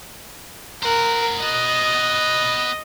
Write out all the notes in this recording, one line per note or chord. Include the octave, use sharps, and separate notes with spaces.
A#4 C5 F#5
B3 F#4 D#5